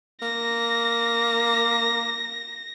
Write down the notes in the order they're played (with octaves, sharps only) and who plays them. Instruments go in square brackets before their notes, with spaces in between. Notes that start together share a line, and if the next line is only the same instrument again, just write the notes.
[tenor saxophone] A#3 [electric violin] A#6